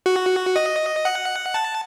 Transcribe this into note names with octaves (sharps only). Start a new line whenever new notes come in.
F#4
D#5
F#5
A5